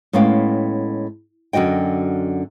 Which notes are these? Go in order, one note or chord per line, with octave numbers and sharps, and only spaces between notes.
A2 G#3 B3 C#4 F5 G5
F#2 D3 F#4 D#5 G5